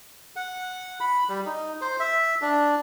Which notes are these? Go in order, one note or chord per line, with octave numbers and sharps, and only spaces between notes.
F#5
B5
G3
D#4
C5
E5
D4